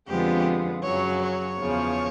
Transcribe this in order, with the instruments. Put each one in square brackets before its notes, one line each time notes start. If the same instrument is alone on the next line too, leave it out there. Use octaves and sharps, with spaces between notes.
[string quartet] F2 D3 F3 G#3 B3 G4
F#2 C#3 F#3 C#5
C#5
E2 C#3 F3